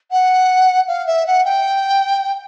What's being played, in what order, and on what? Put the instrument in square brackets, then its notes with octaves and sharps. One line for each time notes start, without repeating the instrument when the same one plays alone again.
[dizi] F#5
F5
E5
F#5
G5